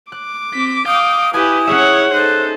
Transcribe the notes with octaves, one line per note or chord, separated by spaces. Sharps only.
D6 F#6
C4 B6
F5 G5 D#6 G6
E4 G4 B4 G#5 D#6
C#4 G#4 C#5 E5 F#5
D#4 A4 C5 F#6